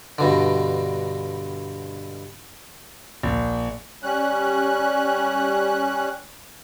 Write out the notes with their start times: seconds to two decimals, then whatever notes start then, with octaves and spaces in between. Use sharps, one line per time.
0.18 G2 B2 D3
3.23 A#1
4.03 G3 C#4 F#6